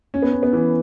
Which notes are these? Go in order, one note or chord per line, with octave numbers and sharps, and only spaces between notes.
C#4
B3
C#4
B3
E3